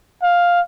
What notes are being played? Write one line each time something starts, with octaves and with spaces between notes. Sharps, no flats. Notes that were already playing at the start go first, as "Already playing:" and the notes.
F5